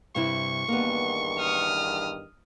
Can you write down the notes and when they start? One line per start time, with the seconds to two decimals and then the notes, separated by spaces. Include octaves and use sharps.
0.15 G2 C3 E4 C#6
0.68 E2 G2 D#3 A#3 B3
1.39 D#6 F6